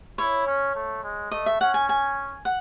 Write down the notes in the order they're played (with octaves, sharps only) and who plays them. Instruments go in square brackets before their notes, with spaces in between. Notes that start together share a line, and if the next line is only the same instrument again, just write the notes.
[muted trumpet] E4 [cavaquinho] C#5
[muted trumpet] C#4
A3
G#3
[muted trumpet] A3 [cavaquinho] D#5
[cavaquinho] E5
[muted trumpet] C#4 [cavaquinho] F#5
[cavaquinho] G#5
G#5
F#5